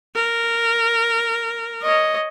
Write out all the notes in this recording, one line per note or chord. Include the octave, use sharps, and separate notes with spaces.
A#4
C#5 D#5